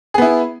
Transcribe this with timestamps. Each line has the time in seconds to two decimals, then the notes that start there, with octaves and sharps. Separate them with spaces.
0.14 G#4
0.18 B3
0.22 E4